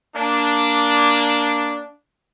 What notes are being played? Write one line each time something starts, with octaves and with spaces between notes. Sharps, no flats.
A#3 D4